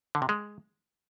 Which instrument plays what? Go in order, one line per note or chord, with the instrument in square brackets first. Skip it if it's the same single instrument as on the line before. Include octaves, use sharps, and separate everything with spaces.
[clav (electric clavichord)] D3
C3
G#3